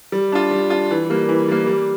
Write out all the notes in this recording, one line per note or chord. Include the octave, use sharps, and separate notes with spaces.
G3
D4 F4
G3
D4 F4
E3
G3 A#3
E3
G3 A#3
G3